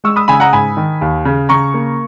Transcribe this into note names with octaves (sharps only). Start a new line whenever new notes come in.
G#3 C#6 E6
B5 D#6
C#3 G#5 B5
F#5 A#5
G#2 G#5 B5
D#3
D#2
C#3
C#3 A#5 C#6
A#3